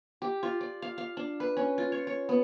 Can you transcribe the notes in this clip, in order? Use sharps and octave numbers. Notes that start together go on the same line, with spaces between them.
G4
F4
D5
F5
F5
D4
B4
C#4
F4
C#5
C#5
B3